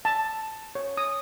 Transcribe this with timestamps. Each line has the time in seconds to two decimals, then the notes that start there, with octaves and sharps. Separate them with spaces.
0.05 A5
0.75 C#5
0.97 D#6